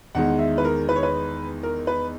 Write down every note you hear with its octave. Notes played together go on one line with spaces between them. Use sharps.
E2 D#3 G#3 F#5
E5
B4
A#4
B4
C#5
B4
A#4
B4